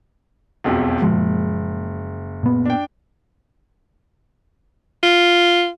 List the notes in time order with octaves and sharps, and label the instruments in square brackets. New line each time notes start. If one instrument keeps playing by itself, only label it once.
[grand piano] E1 B1 F2
[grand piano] F#1 [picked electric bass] A#2 F3 G#3
[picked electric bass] A#2 B3
[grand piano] D4 G5
[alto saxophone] F4